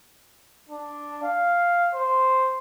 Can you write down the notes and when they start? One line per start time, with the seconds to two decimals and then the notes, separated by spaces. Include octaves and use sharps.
0.69 D4
1.23 F5
1.95 C5